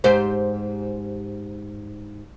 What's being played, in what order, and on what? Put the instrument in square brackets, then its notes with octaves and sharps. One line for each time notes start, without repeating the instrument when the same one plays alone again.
[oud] G#2 G4 C5